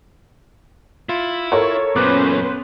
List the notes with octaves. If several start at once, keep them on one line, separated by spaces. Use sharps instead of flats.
E4 F4
A4 A#4 C#5
F#2 A#2 B3 C#4 B4 C5 D6 F#6